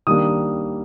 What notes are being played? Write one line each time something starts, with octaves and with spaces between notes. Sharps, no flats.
D#3 G3 A#3 D4 D#6